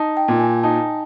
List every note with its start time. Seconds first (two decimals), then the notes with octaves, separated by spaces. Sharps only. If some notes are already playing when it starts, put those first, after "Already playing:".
Already playing: D#4 A5
0.17 G5
0.28 A#2
0.40 G#5
0.63 D#4 A5